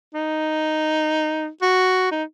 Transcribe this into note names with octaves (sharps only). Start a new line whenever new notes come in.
D#4
F#4
D#4